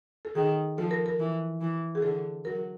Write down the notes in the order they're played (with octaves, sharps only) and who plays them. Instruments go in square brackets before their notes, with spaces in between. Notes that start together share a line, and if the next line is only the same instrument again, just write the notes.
[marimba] A4
[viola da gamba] D#3 [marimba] G#4
[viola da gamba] F3 [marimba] A4
[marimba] A#4
A#4
[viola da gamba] E3
E3
[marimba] G#4
[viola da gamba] D3 [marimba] A4
[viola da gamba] F#3 [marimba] A#4